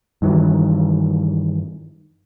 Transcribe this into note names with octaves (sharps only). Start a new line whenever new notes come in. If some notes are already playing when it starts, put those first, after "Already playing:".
G2 D#3 E3 F#3